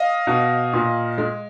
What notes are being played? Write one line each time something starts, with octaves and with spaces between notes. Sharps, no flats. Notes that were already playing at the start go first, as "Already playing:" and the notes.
Already playing: D#5 F5
B2
A#2
G#3